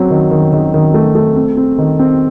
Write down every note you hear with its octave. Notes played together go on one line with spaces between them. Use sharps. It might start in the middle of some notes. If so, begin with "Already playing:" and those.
Already playing: F#3 C4
D#3
D#3
D#3
D#3
A3
A3
C4
C4
D#3
C4